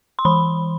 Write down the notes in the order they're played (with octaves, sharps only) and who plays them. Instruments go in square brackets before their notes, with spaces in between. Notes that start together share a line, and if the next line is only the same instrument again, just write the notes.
[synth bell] C6
E3 B5